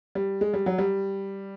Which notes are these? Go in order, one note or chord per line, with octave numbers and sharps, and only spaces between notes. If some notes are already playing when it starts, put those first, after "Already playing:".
G3
G#3
G3
F#3
G3